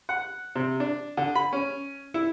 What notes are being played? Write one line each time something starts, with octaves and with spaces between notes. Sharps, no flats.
F#5
C3
D4
D3
B5
C#4
E4